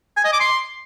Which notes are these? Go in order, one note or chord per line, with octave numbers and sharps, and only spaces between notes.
G#5
D#5
D6
C6